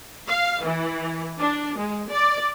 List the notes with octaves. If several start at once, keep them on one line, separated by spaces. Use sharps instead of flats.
F5
E3
D4
G#3
D5